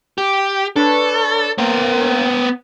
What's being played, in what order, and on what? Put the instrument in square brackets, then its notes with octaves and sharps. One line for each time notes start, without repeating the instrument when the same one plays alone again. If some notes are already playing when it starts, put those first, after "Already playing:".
[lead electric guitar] G4
[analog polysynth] D4 B4 C#5 [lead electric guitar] A4
[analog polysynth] A#3 A#4 [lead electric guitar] B3 C5